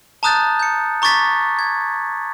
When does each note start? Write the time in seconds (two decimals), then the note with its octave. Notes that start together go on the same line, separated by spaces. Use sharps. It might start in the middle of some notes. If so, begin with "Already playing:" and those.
0.23 A5 A#5 D#6 F#6 G6 A6
0.60 G6 C#7
1.02 A#5 C#6 D6 A6 B6
1.59 G#6